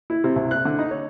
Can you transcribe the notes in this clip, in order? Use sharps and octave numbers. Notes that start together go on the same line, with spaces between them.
E4
C3
C2
F#6
D3
D#4
C#5